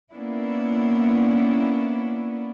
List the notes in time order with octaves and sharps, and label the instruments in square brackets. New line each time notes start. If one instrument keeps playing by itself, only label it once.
[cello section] A#3 B3 C#4 D4 E4